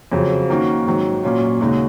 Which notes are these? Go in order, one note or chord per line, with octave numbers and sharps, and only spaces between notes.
F2 C#3 F#3
D#3 A#3 C#4 F#4
G#2 D#3 F#3
A#2 F#3 C#4 F4
D#2 C#3 G#3 D#4 F#4